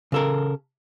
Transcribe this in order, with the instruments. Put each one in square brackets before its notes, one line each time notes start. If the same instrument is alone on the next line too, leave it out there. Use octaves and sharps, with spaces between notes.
[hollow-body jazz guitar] C#3 A4 A#4